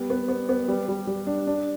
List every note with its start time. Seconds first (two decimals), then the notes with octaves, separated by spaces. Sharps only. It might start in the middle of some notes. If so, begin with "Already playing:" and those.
Already playing: G3 B3
0.10 B3
0.28 B3
0.49 B3
0.68 G3
0.89 G3
1.07 G3
1.27 D4
1.47 D4